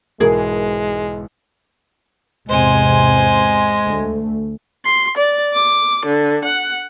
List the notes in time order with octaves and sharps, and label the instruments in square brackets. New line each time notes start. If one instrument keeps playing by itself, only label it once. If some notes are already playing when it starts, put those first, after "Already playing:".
[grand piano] B1 G#2 E3 [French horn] G#3 [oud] G#4 A#4
[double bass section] E2 G#2 C3 [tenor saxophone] G#3 [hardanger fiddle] C5 G#5
[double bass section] D2 A3
[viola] C6
D5
D6
D3
F#5